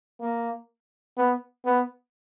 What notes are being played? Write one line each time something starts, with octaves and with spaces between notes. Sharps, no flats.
A#3
B3
B3